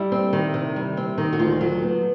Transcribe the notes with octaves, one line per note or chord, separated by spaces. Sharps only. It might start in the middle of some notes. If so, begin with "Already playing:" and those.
Already playing: G3 E4
C4
D#3
C3
G3
C4
D#3
F#4
D2 F4
F#3
B3